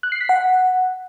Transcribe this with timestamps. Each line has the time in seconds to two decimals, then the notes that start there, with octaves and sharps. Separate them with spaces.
0.03 F#6
0.12 C7
0.21 B6
0.29 F#5